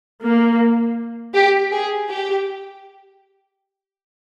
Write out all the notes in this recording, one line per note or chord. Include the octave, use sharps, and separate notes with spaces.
A#3
G4
G#4
G4